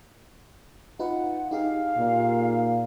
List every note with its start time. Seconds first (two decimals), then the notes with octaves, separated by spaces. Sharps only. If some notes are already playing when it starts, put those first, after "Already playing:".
0.99 D#4 F4 B4 F#5
1.51 D#4 G4 G#4 F5
1.97 A#2